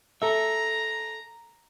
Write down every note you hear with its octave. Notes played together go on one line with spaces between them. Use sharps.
A4 E5 A#5